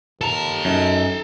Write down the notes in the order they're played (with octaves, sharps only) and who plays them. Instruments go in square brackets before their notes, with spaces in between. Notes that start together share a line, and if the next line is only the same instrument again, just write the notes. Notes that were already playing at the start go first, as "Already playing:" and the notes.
[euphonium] D#2 [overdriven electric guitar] A4 A#5 [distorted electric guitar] A5
[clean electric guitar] F#2 [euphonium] D#4